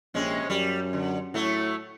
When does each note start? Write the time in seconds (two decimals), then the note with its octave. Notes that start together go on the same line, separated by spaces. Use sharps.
0.14 A#1 C3 G#3 C#4
0.50 F#2 G3
0.93 D3
1.34 A2 F#3 A3